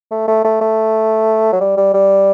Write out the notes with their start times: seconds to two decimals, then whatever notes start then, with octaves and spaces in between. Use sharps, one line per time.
0.11 A3
0.27 A3
0.44 A3
0.61 A3
1.52 F#3
1.60 G3
1.77 G3
1.94 G3